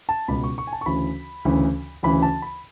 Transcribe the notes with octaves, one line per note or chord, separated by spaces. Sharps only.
A5
C#2 B2 B5
C#6
C#6
G#5
A5
C#6
D2 C#3 E3 B5
D2 C#3 E3
D2 C#3 E3 B5
A5
B5